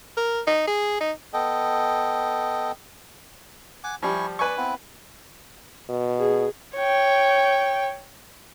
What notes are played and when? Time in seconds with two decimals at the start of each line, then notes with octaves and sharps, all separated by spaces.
0.17 A#4
0.47 D#4
0.67 G#4
1.01 D#4
1.33 B3 A4 D#5 G5
3.84 F#5 G#5 D6
4.03 F3 G3 E4 G#5 C#6
4.39 B4 D5 G#5 C#6
4.57 B3 C4 E4
5.89 B2
6.19 G#4
6.76 C#5 G5